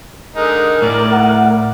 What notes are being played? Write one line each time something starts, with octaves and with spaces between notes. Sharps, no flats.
D3 G#3 D#4 A#4
A2 D5
F#5